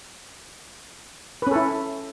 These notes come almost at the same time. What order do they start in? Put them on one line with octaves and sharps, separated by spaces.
B4 C#4 A4 E4